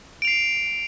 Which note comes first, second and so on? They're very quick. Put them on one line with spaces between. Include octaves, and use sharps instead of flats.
D7 F7 C7